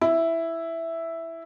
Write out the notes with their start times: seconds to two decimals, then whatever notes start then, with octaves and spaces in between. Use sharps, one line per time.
0.01 E4